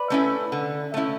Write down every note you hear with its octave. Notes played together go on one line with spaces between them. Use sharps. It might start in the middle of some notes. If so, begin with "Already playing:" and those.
Already playing: B4 D5
A3 C#4 E4
D3
A3 C#4 E4